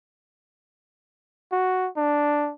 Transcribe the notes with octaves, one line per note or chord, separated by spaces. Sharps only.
F#4
D4